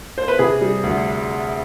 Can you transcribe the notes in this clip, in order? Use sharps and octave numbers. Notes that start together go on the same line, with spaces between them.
C5
B4
C3 G#4
G3
D2